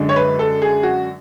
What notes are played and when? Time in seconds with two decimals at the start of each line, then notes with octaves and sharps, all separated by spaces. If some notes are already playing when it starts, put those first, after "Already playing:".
Already playing: F#2 D3 G#3 D4
0.09 C#5
0.16 B4
0.39 A4
0.62 G#4
0.83 F#4